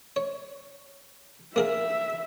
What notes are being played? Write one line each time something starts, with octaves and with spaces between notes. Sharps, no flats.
C#5
A#3 G#4 A#4 E5